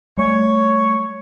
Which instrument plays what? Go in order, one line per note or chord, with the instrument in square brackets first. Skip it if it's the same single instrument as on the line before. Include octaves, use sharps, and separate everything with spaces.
[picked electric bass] G3 A3 [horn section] C#5